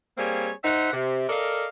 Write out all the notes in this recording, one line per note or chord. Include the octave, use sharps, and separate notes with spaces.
G3 A#3 C4 G#4 C#5
D#4 C5 E5 F#5
C3
A4 A#4 D5 D#5 F5